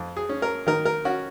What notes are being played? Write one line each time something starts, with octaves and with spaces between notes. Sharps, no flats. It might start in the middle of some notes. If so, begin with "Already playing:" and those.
Already playing: F2
G#4
C#4
A#4
D#3 A#4
A#4
C#4 F#4